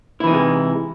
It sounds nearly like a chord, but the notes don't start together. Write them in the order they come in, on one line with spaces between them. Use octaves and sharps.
E4 E3 D#4 C3 G#3